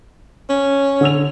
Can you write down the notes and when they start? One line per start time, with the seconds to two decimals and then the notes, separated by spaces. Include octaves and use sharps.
0.50 C#4
1.01 D3 E6 F7